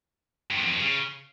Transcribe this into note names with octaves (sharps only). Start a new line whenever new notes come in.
G2
E2
F2
G2
C#3